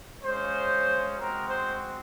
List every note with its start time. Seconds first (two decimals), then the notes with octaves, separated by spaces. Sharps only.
0.23 G#3 C#4 F4 C5
1.17 G#3 C4 F#4 A#4
1.48 C5